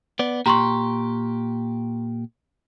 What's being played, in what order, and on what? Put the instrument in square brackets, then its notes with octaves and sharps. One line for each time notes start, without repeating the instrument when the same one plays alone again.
[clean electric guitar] B3 D5
[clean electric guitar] A#2 G4 [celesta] A#5 C6 C#6